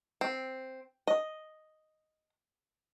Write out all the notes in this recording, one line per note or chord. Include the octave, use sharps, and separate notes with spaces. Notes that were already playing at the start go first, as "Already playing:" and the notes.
C4
D#5